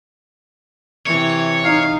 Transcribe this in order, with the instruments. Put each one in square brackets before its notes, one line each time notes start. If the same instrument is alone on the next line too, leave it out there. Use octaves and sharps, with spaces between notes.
[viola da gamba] C3 E3 [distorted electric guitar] C#5
[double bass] D#4 [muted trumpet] F5